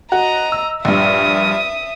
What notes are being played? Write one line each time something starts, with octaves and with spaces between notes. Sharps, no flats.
F#4 D#5 A#5
E6
A#1 G2 E5 D#6